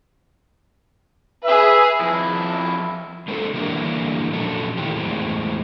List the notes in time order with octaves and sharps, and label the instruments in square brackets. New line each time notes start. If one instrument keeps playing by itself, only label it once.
[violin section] G#4 B4 [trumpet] E5
[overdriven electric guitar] F2 E4
[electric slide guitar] G#3 A#3 C4 D4 F4 A4
D3 E3 G3 A#3 D4 E4
A#2 F3 F#3 C#4 D4 A4
D#3 E3 G3 A3 G4
E2 A2 G#3 C4